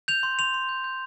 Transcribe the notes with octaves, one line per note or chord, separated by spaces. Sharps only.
G6 F7
C6
C6 F7
C6
G6
G6